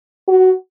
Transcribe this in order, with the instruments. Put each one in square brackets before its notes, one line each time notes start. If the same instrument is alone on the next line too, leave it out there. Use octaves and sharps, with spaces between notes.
[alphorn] F#4